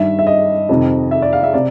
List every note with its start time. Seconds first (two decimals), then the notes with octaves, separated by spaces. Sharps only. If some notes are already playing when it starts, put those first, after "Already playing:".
Already playing: G2 D#3 E5
0.19 E5
0.27 D#5
0.69 F2 C3 D#3
1.11 E5
1.22 D5
1.33 F5
1.43 E5
1.54 C3 D5